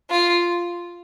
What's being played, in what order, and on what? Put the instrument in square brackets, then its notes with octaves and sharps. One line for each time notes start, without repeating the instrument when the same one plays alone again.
[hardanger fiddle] F4